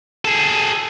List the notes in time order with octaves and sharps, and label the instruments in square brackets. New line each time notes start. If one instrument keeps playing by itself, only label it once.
[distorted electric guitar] G#4 A4